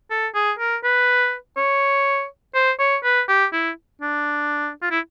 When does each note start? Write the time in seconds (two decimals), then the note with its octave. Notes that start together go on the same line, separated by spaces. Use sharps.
0.10 A4
0.35 G#4
0.59 A#4
0.84 B4
1.57 C#5
2.55 C5
2.79 C#5
3.04 B4
3.29 G4
3.53 E4
4.02 D4
4.82 F4
4.91 E4